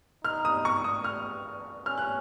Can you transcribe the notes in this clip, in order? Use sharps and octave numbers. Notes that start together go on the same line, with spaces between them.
D#4 F6
D#6
C#6
D#6
F6
C#4 F6
F#6